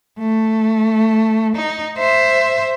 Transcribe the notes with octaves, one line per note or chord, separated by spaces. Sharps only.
A3
D#4
C5 E5